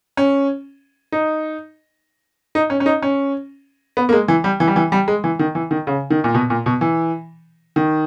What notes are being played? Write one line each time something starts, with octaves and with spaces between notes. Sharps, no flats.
C#4
D#4
D#4
C#4
C#4
D#4
C#4
B3
A#3
G#3
E3
G3
E3
G3
E3
G3
G#3
E3
D#3
E3
D#3
C#3
D#3
A#2
B2
A#2
B2
E3
D#3